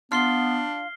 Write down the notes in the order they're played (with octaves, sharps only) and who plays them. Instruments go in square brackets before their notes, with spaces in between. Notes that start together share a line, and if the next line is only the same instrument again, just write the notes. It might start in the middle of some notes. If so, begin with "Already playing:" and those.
[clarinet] B3 [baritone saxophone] D4 [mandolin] F4 [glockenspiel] F6 C7 G7